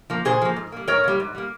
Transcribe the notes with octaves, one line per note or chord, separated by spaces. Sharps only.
F3 A#3
A#2 G#4 C5
F3 A#3
G#2
G3 A#3
G#2 A#4 C#5
G3 A#3
G#2
G3 A#3